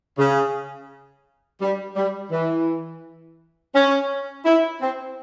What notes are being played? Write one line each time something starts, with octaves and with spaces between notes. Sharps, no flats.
C#3
G3
G3
E3
C#4
E4
C4